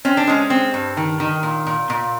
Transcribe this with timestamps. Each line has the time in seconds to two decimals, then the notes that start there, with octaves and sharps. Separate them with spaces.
0.05 C4 C#4
0.17 D4
0.27 G#3 C#4
0.50 C4
0.74 G2
0.97 D#3
1.20 D#3
1.43 A#2
1.66 A#2
1.90 A#2